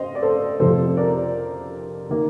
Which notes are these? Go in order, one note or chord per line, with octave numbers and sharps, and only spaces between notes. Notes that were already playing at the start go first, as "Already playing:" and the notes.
Already playing: C5 D#5 F5
D5
A4 C5
F2 C3 F3 A4 C5
A#4 D5
D#3 A#3